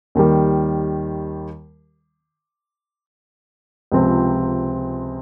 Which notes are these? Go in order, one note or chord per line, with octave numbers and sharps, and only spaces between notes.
D#2 D#3 G3
C#2 C3 F3 C4